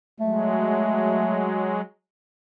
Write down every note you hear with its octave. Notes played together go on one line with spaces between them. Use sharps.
F#3 G#3 A3